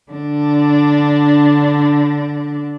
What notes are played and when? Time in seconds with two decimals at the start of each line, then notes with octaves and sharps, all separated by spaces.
0.12 D3 D4